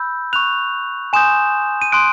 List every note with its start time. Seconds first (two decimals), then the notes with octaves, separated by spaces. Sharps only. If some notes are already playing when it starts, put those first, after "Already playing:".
Already playing: B5 E6 G6
0.33 C#6 F#6 F7
1.13 G#5 C6 D#6 G6 E7
1.82 D#7
1.92 C6 D#6 F#6 D7